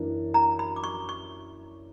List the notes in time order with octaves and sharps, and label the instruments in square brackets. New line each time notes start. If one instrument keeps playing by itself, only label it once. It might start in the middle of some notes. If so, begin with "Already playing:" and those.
Already playing: [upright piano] F#2 E3 A#3 D4
[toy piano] A#5
B5
D6
C#6
C#6